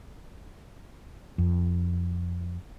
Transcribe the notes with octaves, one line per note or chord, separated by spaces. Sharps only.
F2